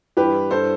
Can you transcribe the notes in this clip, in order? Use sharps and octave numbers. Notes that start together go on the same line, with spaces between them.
G2 E3 G4 B4
G2 E3 A4 C5